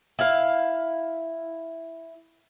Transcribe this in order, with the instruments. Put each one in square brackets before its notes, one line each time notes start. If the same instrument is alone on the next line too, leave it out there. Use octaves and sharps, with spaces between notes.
[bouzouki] E4 F5